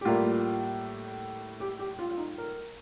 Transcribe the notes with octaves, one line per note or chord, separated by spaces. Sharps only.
G4
A2 G3 A#3 F4
G4
G4
F4
F4
D#4
A#4